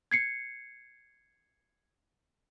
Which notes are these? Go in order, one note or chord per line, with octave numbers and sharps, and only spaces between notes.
G#6 C7 C#7